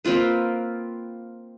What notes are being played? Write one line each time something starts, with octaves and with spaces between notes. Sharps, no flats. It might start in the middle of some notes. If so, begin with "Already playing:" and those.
A#3 C4 F4 B4